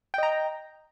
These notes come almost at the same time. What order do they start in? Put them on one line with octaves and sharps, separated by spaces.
G5 D#5 A#5